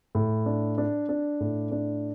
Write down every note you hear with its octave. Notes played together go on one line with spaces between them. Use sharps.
A2
D4
D4
D4
A2
D4